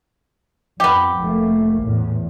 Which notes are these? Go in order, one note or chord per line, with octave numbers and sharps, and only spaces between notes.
F2 B3 G4
F1 A3 A#3
E2 A2